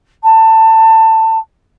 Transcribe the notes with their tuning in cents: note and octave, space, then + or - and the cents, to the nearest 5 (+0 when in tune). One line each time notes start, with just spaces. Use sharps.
A5 +20